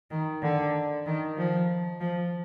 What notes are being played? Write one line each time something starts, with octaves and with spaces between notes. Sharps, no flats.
D#3
D3
D#3
F3
F3